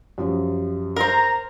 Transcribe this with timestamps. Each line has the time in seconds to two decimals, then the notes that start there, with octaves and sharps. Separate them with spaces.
0.18 F#2 F3 G3
0.96 A#4 C5 A#5